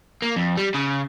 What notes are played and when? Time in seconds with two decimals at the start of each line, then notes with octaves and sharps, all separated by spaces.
0.22 A#3
0.36 F2
0.57 G3
0.74 C#3